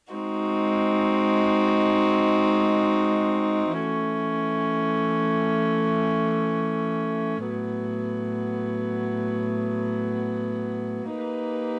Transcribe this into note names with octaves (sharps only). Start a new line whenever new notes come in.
G#3 C4 D#4 F#4
E3 A3 C#4
A2 F#3 B3
A#3 D#4 G4 B4